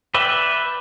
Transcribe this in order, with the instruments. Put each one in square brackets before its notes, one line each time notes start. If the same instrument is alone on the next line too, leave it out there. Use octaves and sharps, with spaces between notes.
[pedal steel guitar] B4 D5 E5 G5